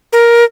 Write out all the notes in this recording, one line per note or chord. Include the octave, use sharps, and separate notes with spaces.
A#4